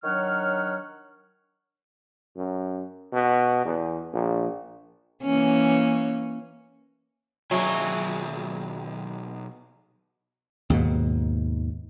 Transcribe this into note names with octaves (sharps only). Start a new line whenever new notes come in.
D#3 F#3 D4 C#5 F#5 F6
F#2
B2
E2
A#1
E3 A#3 C#4
B1 D#3 F#3 G#4 E5 G#5
D#2 G#2 B2